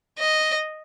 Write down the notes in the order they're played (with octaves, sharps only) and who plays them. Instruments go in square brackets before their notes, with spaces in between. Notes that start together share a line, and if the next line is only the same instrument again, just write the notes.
[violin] D#5